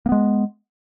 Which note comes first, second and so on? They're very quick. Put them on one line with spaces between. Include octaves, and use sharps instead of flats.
A#3 B3 G#3